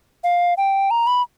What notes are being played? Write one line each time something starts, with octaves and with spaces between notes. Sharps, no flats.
F5
G5
A#5
B5